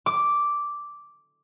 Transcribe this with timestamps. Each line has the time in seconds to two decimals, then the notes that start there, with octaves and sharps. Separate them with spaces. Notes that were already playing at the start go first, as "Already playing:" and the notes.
0.06 D6